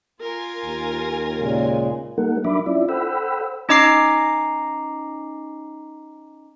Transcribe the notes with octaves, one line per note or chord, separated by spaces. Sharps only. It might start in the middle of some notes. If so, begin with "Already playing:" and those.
F4 A#4 G#5
D#2
A#2 C#3 G#3
G3 A#3 D#4 A4 A#4 F#5
F#3 D4 E5 B5 D6
C#4 E4 F4 D5 E5
A4 C5 F#5 G5 B5 E6
C#4 D#4 D#5 A#5 D6 C7